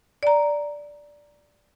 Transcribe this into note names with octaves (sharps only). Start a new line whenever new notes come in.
D5 A#5